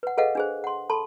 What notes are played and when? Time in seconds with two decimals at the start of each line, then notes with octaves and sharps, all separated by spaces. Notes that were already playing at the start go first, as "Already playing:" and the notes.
0.03 B4 F#5
0.17 G#4 A4 B4 D#5 F5 F#5
0.35 D4 G#4 C5
0.64 F#5 C6
0.90 A4 A5 B5 C6